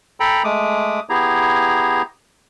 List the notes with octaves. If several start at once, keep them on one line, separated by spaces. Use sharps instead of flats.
A4 G5 A#5 B5
G#3 A3 D6 D#6
B3 E4 G4 G#4 A#5